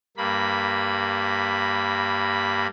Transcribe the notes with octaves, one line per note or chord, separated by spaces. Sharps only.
G2 A#3 B5